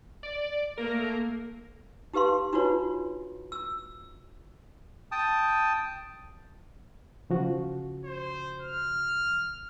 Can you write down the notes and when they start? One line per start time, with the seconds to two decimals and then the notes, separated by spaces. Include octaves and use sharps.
0.23 D5
0.78 A3 A#3 A#4
2.13 D#4 G4 B4 F5 C6
2.53 D4 D#4 F4 F#4 B4 C#5
3.52 E6
5.12 G5 A5 D#6
7.30 C#3 F3 F#4
8.05 C5
8.61 F6